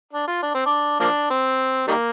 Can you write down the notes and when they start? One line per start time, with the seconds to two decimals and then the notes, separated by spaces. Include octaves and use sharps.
0.13 D4
0.27 F4
0.42 D4
0.54 C4
0.66 D4
1.00 F3 A#3 D4
1.30 C4
1.87 D#3 G3 A#3